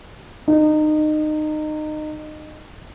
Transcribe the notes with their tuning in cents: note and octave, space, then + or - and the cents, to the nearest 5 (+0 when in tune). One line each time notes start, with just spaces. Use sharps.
D#4 -25